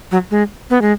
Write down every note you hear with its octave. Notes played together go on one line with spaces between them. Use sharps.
F#3
G#3
B3
G#3